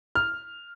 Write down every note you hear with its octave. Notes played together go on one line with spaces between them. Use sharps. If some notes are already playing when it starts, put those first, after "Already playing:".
F6